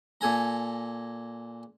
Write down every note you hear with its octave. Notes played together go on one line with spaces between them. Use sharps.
A#2 A4 G#5 A#5